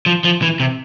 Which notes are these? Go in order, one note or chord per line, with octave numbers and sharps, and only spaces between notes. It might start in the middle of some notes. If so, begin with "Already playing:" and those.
F3
F3
E3
C3